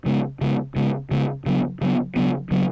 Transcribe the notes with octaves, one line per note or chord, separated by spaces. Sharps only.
C#3 G#3 B3
C#3 G#3 B3
C#3 G#3 B3
C#3 G#3 B3
C#3 F#3 B3
C#3 F#3 B3
C#3 F#3 B3
C#3 F#3 B3